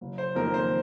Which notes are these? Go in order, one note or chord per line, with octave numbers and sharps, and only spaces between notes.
F#1
C5
F2 D#3 A#3 A#4
C5